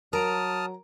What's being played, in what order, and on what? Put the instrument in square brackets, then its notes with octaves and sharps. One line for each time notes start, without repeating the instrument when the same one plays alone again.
[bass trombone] F#3 [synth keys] A#4 D7 [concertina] A5 D#6 F6 [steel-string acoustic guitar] A#5